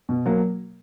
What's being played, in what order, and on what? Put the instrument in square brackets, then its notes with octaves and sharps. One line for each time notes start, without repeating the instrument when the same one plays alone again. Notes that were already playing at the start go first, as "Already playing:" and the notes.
[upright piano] B2
F#3 A#3